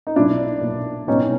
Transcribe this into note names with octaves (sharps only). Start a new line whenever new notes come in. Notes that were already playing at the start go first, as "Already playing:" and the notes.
D#4
B1 A#2 F#3 D4 E4
B1 A#2 F#3
C2 B2 G3 C4 C#4 D#4